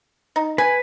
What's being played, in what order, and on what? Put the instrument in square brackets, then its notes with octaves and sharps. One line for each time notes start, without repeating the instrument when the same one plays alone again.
[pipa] D#4
[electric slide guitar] B4 [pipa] G#5